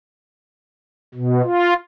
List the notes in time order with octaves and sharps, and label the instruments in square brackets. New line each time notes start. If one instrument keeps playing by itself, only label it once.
[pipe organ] B2
F4